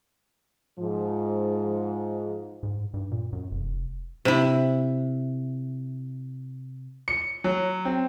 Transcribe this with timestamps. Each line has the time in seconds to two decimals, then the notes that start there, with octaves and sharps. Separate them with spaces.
0.79 G#2 F3
2.63 G#2
2.94 G2
3.12 A#2
3.33 F#2
3.51 F1
4.25 C3 E4
7.08 C#7
7.44 F#3
7.85 C4